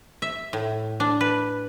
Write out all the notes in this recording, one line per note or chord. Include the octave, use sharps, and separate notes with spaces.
E5
A2
D4
B4